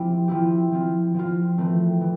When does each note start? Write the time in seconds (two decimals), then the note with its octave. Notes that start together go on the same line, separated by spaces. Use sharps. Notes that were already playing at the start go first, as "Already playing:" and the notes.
Already playing: F3 C4 E4 G4
0.28 F3 C4 E4 G4
0.71 F3 C4 F4
1.14 F3 C4 F4
1.58 E3 A3 C4
2.01 E3